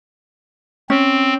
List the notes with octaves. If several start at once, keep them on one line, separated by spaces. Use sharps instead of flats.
C4 C#4